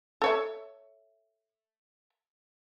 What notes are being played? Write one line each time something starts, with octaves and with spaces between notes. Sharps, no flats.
A4 C#5 E5